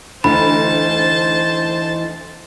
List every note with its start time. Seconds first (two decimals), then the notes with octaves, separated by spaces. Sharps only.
0.24 D2 E3 D#4 C5 A5 B5